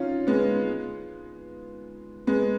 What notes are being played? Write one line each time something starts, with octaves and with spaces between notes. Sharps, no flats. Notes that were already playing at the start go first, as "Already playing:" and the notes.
Already playing: C#4 D#4 F4
G#3 B3
G#3 B3